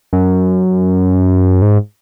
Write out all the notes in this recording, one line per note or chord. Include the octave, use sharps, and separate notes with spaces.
F#2
G#2